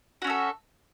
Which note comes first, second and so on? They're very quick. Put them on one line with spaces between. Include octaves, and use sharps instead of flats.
F#4 C#4 E5 A4